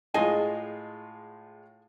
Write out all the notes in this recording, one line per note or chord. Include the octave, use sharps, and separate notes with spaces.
A2 G#3 F4 G#4 D#5 G#5